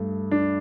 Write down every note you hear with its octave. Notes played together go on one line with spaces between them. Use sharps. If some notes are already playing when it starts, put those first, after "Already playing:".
Already playing: G2 A3
D4